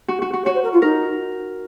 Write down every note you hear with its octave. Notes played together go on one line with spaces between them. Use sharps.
F#4
F#4
F#4
F#4 C#5
C5
A#4
F4
D#4 A#4